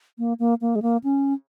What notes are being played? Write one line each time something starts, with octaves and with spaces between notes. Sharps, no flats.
A#3
A#3
A#3
G#3
A#3
C#4